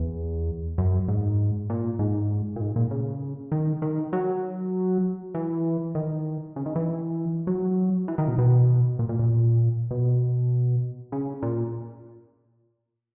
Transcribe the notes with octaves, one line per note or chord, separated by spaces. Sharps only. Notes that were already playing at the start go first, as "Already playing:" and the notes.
Already playing: E2
F#2
G#2
A#2
G#2
A#2
G#2
A#2
C#3
D#3
D#3
F#3
E3
D#3
C#3
D#3
E3
F#3
E3
D#3
B2
B2
A#2
A#2
A#2
B2
C#3
A#2